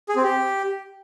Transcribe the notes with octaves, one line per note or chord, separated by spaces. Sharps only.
G#4
C4
G4